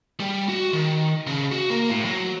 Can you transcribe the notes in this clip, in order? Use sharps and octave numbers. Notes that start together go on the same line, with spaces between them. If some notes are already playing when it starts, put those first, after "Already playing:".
G3
F#4
D#3
C#3
F#4
A#3
A2
F#3